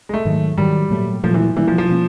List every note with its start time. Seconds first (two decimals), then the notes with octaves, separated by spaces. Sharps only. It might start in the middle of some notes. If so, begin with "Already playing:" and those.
0.09 G#3
0.14 A3
0.25 G#2 D#3 F#3
0.58 G#2 D#3 F#3 G3
0.91 A#2 F#3 A3
1.23 A#2 F3 F#3 A3
1.34 E3
1.56 B2 E3 G3 A#3 C#4
1.68 F3
1.78 F3
1.89 B2 G3 A#3 C#4